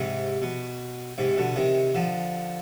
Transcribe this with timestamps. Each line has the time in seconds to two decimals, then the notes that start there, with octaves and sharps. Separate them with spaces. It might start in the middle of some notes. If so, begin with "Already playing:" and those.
Already playing: G#2 C3
0.42 B2
1.18 G#2 C3
1.37 B2 D3
1.56 C3 D#3
1.95 D3 F3